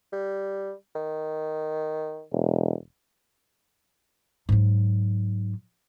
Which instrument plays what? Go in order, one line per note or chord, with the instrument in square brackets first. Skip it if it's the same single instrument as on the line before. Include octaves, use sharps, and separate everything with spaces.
[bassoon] G3
D#3
[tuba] E1
[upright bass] G#2 F#3